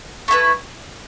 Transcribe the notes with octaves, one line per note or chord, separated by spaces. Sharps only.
A3 E4 B4